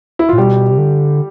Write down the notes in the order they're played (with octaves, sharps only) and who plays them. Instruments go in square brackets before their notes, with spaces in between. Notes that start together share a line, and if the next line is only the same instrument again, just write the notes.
[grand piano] E4
[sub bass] A2 [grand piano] F4
[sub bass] B2 [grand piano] G3 G4
[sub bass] C3
D3